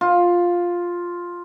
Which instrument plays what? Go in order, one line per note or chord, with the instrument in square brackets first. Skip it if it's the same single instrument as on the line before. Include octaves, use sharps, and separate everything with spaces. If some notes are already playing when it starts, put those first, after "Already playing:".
[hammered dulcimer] F4